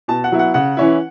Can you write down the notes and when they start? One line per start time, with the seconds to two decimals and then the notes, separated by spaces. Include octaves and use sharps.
0.08 B2 A5
0.24 F#5
0.32 F#3 B3 E4
0.39 F#5
0.54 C#3 F#5
0.77 E3 C#4 E4